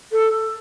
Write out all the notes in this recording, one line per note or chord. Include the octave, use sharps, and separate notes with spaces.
A4